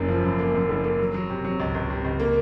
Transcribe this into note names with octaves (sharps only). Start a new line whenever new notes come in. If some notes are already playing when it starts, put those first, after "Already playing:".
Already playing: F#1 F#2 A#3
F3
F#2
A#3
F#2
F#1
A#3
F#3
F#3
C3
F#3
C#2
C#2
C3
C#2
A#3